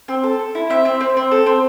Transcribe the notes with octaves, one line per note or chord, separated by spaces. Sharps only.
C4
A4
A4
E4
C4 E5
C4
C4
C4
A4
C4